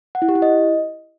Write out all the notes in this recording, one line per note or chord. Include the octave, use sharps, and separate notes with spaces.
F#5
E4
G4
E4
D#5